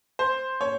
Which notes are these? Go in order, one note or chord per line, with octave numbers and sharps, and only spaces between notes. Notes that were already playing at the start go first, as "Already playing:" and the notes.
C5
C#5